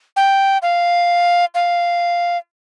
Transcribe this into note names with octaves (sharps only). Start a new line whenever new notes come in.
G5
F5
F5